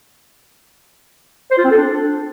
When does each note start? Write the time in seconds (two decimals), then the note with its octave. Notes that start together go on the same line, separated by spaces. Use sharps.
1.51 C5
1.57 F4
1.64 C4
1.71 A4
1.77 D4